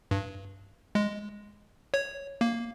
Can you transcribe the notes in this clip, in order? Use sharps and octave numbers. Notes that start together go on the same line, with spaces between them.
G2
G#3
C#5
A#3